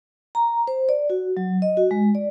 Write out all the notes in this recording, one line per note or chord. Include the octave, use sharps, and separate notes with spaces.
A#5
C5
D5
F#4
F#3
D#5
F#4
G#3
D5